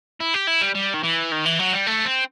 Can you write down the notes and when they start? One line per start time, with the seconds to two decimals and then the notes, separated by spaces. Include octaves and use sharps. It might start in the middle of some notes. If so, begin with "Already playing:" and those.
0.20 E4
0.34 G4
0.47 E4
0.61 G3
0.75 G3
0.94 D#3
1.03 E3
1.31 D#3
1.45 E3
1.59 F#3
1.73 G3
1.87 A3
2.06 C4